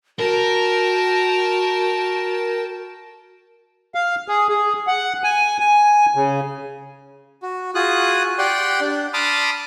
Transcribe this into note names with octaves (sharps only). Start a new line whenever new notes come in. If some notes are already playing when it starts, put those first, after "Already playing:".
F#4 A#4 G5 A5
F5
G#4
G#4
F#5
G#5
G#5
C#3
F#4
F4 F#4 G#4 D#6 F#6
G4 D5 F#5 G5 C6
D4
A5 B5 C6 D6 D#6 F6